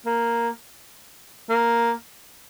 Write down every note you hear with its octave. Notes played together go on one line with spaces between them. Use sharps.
A#3
A#3